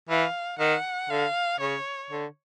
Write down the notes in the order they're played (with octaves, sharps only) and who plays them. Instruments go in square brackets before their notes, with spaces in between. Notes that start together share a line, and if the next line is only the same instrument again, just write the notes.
[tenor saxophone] E3 [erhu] F5
[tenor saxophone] D#3 [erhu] F#5
[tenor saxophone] D3 [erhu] F5
[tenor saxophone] C#3 [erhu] C#5
[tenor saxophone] D3